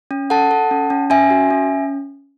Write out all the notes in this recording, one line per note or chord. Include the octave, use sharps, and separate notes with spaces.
C#4
A4 F#5 A5
A4
C#4
C#4
C#4 E5 G#5
F#4
C#4